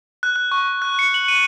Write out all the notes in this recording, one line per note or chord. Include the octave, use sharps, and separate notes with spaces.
F#6
F#6
C#6
F#6
C#7
F#7
D#7